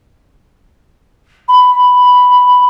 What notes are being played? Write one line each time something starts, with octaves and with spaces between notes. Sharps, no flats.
B5